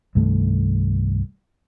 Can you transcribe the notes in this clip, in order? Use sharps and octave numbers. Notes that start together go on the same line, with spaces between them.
C2 G2 D#3 A3